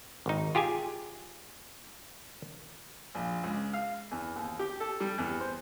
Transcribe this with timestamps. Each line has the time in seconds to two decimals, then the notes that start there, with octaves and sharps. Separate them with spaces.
0.26 G#1 D#4
0.55 F4 G4 G#4 G#5
3.15 A#1
3.43 C#2
3.73 F5
4.11 E2
4.36 D#2
4.59 G4
4.80 A4
5.00 G3
5.18 E2
5.40 C5